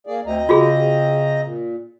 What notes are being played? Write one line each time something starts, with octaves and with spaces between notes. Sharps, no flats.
A#3 G#4 D5
D2 C4 D#5 A#5
C#3 F4 F#4 G#4
A#2